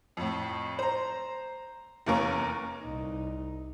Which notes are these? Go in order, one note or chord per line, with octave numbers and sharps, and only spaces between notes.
F2 A2
C5 A#5
F1 E2 A#3 C#4 A#4 C#6
C2 D#4